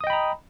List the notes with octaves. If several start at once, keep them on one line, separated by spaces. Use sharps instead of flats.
D#5 G5 A#5 B5 D#6